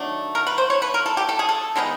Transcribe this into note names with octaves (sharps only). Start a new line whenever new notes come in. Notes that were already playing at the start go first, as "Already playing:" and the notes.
Already playing: D#3 F#3 A3 D4
A#4
B4
C5
C#5
B4
A#4
A4
G4
A4
G#4
A4
D#3 G#3 B3 D#4